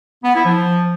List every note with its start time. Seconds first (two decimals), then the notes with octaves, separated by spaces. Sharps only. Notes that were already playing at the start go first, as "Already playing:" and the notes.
0.24 B3
0.34 E4
0.45 F3